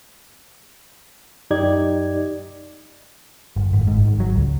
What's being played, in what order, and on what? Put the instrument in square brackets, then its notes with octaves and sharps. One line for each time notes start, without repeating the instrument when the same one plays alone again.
[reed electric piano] F#2 D#4 G4 D5 D#5 G#6
[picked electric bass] G1
G#1
G#2
G#1
F#3
C#2